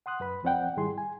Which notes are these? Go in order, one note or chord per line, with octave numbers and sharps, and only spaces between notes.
F#5 C6 D#6 F#6
F#2 B4 B5
E2 F3 C4 D5 F#5 G5
G#2 D#3 G3 E4 G#4 C6
G#5